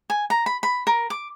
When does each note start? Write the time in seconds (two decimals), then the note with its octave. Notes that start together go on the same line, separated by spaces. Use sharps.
0.10 G#5
0.30 A#5
0.46 B5
0.63 B5
0.87 A#4
1.10 D6